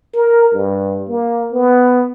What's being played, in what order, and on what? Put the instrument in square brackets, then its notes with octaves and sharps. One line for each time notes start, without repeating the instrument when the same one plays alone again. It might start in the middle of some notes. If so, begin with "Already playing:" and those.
[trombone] A#4
G2
A#3
B3